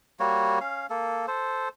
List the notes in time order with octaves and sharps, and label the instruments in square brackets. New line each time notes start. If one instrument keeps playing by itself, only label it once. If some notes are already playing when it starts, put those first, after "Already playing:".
[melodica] G3 A#3 F#4 C#5
C#4 F5
A#3 A4
A4 C5